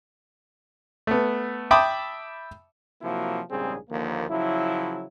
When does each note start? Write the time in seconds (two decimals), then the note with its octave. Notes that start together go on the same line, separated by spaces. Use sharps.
1.07 A3 B3
1.71 E5 G5 A5 B5 D6 D#6
3.02 C3 F3 F#3 A#3 E4 F#4
3.50 A#1 G#2 C#3 G3 C4 G#4
3.90 D#2 D3 F3 A#3
4.29 C#3 F3 F#3 E4